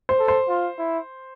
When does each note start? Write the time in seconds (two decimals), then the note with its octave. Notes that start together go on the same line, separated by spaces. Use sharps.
0.09 C5
0.19 A4
0.28 C5
0.48 F4
0.78 E4